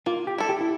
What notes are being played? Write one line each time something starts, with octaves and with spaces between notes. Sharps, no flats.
A#3 F4
G4
E4 A4
G4
E4